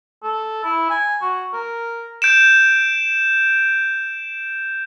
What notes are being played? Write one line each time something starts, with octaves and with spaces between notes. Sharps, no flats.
A4
E4
G#5
F#4
A#4
G6 D7 E7